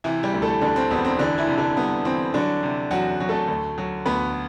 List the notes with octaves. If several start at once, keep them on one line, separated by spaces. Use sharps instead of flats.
C3 E3 E4
G3 G4
D2
A3 A4
D2 D3 D4
C4
E1 B3
C4
D3 E3 D4
E3 E4
C3
D3 D4
G3 B3
E3 C4
D3 F#3 D4
C3
E2 F#3 F#4
F#3
A3 A4
D2
F#3
D2 B3 B4